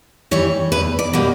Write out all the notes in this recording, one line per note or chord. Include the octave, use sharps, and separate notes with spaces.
E3 G3 C#5
E2 B4
D5
B2 G3 A#3